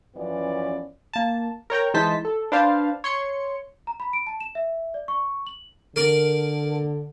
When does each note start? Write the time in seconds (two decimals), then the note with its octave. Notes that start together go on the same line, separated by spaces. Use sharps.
0.15 F#2 E3 F3 B3 C#4 D5
1.13 A#3 A5
1.70 A#4 C#5 G5 A#5
1.94 E3 G#3 D#4 C5 A5 B6
2.25 A4
2.52 D4 B4 C5 F5 A5
3.04 C#5 C6 C#7
3.87 A#5
4.00 B5
4.13 D7
4.27 A5
4.40 E7
4.55 E5
4.94 D5
5.08 C#6
5.47 F#7
5.96 D3 A#4 D5